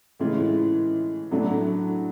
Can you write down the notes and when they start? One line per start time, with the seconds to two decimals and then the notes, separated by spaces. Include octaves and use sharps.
0.20 A2 E3 G#3 C#4 F4
1.31 A2 F#3 A3 D4 F#4